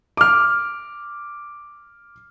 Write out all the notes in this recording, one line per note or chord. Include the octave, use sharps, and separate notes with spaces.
D6 F6